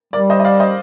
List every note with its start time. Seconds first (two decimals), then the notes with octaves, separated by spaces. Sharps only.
0.13 G3 A#4 D5
0.30 C5 D#5
0.40 D#5
0.44 D5 F5
0.60 C5 D#5